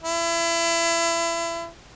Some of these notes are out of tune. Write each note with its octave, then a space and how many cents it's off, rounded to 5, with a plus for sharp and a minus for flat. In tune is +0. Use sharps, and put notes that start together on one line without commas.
E4 +30